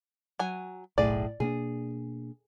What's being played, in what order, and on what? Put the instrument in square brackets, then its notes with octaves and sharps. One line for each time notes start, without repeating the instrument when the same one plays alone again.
[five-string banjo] F#3 G#5
[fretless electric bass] F#1 B1 [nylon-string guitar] A2 G#4 [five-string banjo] D5
[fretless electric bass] B2 A#3 D4 [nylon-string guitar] G#4